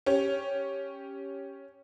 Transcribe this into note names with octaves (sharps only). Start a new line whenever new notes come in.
C#4 G4 C#5